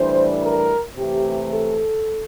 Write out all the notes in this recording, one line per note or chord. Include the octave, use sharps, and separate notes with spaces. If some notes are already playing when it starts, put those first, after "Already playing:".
Already playing: A2 E3 G3 D4 C5
A#4
C3 E3 A3 G4
A4